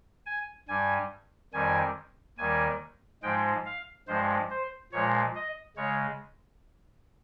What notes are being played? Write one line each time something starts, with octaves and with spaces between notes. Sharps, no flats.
G#5
G2 G3 G#5
F2 D#3 G3 G#5
D#2 D#3 G3 G#5
G#2 F3 G#3 G5
F5
G2 F3 G#3 C5
C5
A#2 F3 G#3 C#5
D#5
C#3 G#3 C#5